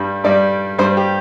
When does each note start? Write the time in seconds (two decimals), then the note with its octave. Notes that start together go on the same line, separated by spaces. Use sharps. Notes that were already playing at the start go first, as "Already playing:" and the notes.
Already playing: G2 G3
0.24 G2 G3 D5
0.78 G2 G3 C5
0.97 G4